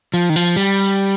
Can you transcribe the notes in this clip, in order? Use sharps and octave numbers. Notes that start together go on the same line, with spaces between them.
F3
D#3
F3
G3